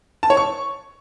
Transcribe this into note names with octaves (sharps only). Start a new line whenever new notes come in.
A5
C#5
C#6